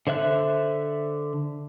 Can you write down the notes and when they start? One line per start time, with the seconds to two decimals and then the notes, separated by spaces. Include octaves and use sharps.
0.07 D3 C5 E5 F#6